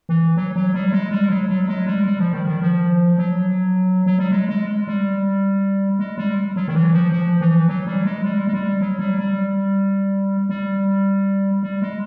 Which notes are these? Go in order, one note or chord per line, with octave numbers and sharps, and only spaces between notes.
E3
F#3
F#3
G3
G#3
G3
F#3
F#3
G#3
G3
G3
F3
D#3
D#3
F3
F#3
F#3
G3
G#3
G#3
G3
G#3
G3
F#3
D#3
E3
F3
F3
E3
F#3
G3
G#3
G3
G#3
G3
F#3
G3
G3
G3
G3
G#3